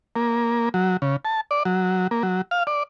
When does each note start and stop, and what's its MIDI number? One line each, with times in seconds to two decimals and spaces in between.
0.16 0.69 58
0.74 0.97 54
1.02 1.16 49
1.25 1.41 81
1.51 1.63 74
1.65 2.07 54
2.11 2.23 58
2.23 2.41 54
2.51 2.63 77
2.67 2.83 74